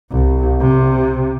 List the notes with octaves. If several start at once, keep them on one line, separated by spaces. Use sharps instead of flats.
C2
C3